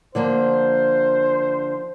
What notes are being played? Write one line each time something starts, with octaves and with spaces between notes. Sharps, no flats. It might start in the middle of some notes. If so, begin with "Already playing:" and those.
D3 F3 A#3 C5